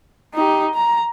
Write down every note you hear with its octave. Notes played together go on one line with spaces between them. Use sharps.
D#4 G4
A#5